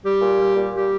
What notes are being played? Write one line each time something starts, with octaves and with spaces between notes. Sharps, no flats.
G3 G4
A#2
G3
A#2
G3 G4